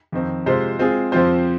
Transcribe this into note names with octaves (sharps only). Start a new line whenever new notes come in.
F2 D#3 C4
C3 G#3 F4 C5
G#3 C4 F4 G#4
F2 F3 C4 F4 C5